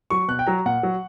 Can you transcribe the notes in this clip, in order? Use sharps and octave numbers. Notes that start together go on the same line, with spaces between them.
F#3 C#6
B2 F#6
G5
F#3 A#5
A#2 F#5
F#3